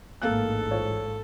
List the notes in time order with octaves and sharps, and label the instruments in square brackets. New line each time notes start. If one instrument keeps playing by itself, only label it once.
[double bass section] A1 G#2 [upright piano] A3 A#3 F#6 [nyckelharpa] A4
[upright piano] F4 C5 C#5